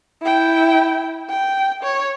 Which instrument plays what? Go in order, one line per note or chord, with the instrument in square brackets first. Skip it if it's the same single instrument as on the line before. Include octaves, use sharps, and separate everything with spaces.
[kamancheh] E4 G5
G5
C#5